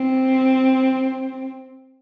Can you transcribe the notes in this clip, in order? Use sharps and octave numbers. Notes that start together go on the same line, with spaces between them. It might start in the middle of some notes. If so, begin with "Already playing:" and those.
Already playing: C4